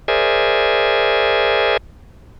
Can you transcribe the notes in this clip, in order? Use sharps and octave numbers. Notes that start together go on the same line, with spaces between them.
G#4 A#4 C5 D5 E5 G#5